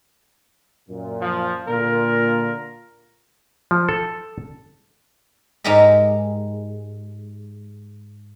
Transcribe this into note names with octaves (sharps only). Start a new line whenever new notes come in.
F#2 A#2
F3
A#2 D3 F4 A#4
F3
A4
G#2 G#3 D#4 G4 A#4 E5